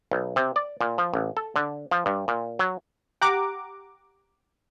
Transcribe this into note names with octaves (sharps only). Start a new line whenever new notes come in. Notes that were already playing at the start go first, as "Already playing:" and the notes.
B1
C3
D5
A#2
F3
A1
A4
D3
F3
G2
A#2
F#3
G4 F#5 A#5 D6